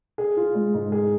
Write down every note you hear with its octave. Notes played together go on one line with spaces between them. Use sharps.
G#4
F4
G#3
G#2
G#4